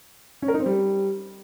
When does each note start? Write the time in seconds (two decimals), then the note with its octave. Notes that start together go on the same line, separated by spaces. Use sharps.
0.42 C#4
0.48 A#4
0.54 D#4
0.60 C4
0.66 G3